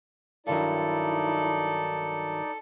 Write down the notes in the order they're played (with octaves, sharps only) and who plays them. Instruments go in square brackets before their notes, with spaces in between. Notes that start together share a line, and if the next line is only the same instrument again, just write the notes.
[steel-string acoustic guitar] G2 D#3 F#3 [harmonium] D#4 D5 [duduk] E4 [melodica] A4